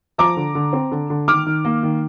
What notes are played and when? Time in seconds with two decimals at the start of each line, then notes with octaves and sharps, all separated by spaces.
0.18 F3 A#5 D6
0.36 D3
0.55 D3
0.73 C4
0.92 D3
1.10 D3
1.28 D#3 D6 F6
1.46 D#3
1.65 A#3
1.83 D#3